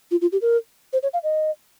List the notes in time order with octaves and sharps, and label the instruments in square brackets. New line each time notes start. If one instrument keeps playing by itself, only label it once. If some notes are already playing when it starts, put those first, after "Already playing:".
[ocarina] F4
F4
G4
A#4
C5
C#5
F5
D#5